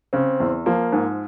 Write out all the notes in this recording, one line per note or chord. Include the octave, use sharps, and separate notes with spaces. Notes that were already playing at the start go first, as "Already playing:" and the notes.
C#3 C4
E2
F3 A#3
G#2